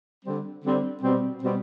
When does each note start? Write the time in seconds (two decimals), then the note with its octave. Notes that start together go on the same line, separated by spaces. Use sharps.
0.25 D3 G3 C4
0.64 D3 G3 C4
1.03 B2 G3 C4
1.42 B2 G3 C4